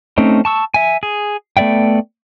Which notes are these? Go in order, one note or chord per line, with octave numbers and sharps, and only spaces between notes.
A3 C4 C#4 D#4
A5 C#6 E6
E5 G#5
G#4
A3 B3 D5 E5 G5